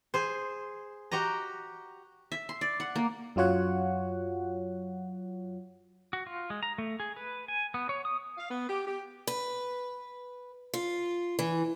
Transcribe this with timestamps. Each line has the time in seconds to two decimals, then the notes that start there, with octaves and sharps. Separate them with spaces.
0.14 G#4 C5
1.12 F#4 G4 D#5 A#5
2.32 E5
2.49 C6
2.61 D5
2.80 F#5
2.96 A#3
3.36 F#2 F#3 F4 C#5 F#5
6.13 F#4
6.27 F4
6.50 G#3
6.63 A#5
6.78 A3
7.00 G#4
7.17 B4
7.48 G#5
7.74 B3
7.89 C#5
8.05 D#6
8.38 F5
8.51 B3
8.69 G4
8.87 G4
9.27 B4
10.74 F4
11.39 E3